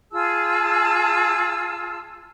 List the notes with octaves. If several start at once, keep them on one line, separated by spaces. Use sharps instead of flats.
F4 G#4 A5 E6